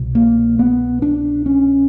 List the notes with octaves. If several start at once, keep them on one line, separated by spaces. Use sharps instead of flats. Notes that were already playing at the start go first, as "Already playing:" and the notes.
Already playing: C2 B2
A#3
B3
D4
C#4